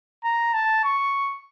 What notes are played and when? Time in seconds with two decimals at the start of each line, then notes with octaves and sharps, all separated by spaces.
0.24 A#5
0.54 A5
0.84 C#6